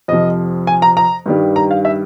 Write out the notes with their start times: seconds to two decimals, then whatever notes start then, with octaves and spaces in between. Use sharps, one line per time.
0.08 F2 C3 F3 D#5
0.67 G#5
0.82 A#5
0.97 A#5
1.26 G2 D#3 G3
1.56 A#5
1.71 F5
1.85 E5